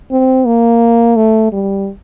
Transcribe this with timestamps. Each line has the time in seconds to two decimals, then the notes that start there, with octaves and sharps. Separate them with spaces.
0.12 C4
0.46 A#3
1.16 A3
1.52 G3